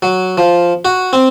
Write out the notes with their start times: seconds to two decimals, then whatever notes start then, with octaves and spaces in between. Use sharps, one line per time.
0.02 F#3
0.38 F3
0.85 F#4
1.13 C4